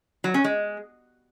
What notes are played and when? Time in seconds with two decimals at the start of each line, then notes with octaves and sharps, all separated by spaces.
0.24 F#3
0.34 C#4
0.44 G#3